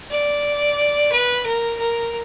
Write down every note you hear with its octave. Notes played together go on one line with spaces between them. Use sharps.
D5
B4
A#4
A#4